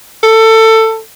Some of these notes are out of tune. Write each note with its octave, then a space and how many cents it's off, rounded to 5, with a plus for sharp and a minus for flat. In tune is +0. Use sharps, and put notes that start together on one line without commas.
A4 +20